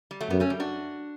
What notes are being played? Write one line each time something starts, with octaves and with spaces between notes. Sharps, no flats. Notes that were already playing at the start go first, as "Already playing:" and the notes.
G3
F#3 A3
F#2 G3 B3
A3 C#4
G3
D4 F#4